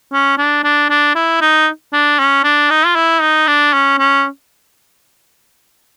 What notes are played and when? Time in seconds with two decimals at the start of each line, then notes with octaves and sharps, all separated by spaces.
0.13 C#4
0.38 D4
0.64 D4
0.90 D4
1.15 E4
1.41 D#4
1.93 D4
2.19 C#4
2.44 D4
2.70 D#4
2.86 F4
2.96 E4
3.21 D#4
3.48 D4
3.73 C#4
3.99 C#4